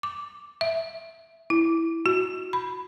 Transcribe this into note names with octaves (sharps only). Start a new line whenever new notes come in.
D6
E5
E4
F#4
B5